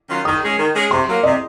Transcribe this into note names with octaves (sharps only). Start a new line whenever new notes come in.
D#3 F#3 C#4 F4
D#3 D#6
G#3 C#4 G#4
D#3
G#3 C#4 G#4
C3 C6
F#3 A#3
C3 D#5